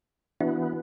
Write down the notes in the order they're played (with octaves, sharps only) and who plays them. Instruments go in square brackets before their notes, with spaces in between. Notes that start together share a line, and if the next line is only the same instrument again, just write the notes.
[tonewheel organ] E3 B3 [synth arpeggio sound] D4 E4 F#4